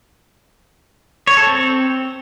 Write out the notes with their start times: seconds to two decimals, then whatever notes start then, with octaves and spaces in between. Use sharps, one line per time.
1.27 C#5
1.37 A4
1.47 C4